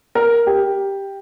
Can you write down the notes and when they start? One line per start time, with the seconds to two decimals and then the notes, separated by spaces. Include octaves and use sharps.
0.15 A#4
0.47 G4